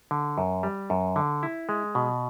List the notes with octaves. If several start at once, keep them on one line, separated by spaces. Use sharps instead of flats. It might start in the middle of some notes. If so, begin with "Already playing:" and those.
D3
F#2
G3
F#2
D3
E4
G#3
B2